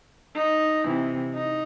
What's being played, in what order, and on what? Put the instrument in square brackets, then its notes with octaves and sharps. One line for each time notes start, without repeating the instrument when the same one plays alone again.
[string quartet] D#4
C3 E3
D#4